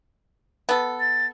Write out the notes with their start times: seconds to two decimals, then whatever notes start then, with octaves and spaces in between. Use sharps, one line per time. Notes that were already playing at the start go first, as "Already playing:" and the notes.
0.69 B3 A4
1.00 A6